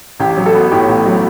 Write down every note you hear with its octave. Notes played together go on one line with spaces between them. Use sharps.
A1 G4
F#3
A4
B3
A2 G4
A1
F#3